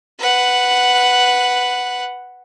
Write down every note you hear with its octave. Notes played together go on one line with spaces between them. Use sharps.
B4 F#5